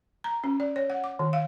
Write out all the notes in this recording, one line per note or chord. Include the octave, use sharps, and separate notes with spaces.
A#5
C#4
D5
C#5
F#5
D6
D#3
F5